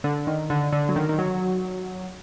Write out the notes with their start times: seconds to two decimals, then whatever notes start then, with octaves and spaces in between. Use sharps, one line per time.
0.04 D3
0.27 D#3
0.50 D3
0.73 D3
0.89 F#3
0.96 D#3
1.09 D#3
1.18 F#3